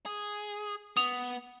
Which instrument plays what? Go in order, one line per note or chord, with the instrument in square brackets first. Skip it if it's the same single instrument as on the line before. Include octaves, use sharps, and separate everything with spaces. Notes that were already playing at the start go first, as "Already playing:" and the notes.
[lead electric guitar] G#4
[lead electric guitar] B3 [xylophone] D#6 F7